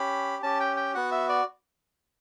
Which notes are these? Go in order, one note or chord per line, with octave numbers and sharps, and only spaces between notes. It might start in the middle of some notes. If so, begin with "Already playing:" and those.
Already playing: C#4 G4 B5
C#4 G4 A5
G5
G5
B3 F#4 F#5
E5
D5